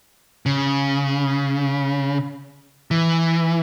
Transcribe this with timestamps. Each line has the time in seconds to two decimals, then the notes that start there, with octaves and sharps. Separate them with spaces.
0.46 C#3
2.91 E3